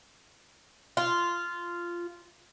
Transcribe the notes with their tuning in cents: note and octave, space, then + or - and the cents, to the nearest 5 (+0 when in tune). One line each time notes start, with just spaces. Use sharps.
F4 -10